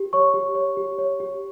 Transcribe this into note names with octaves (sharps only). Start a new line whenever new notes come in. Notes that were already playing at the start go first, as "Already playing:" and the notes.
Already playing: G4
C#5 C#6
G4
C#5
G4
C#5
G4